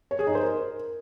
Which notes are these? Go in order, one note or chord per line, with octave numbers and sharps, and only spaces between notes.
C#5
G#4
D#4
C5
A#4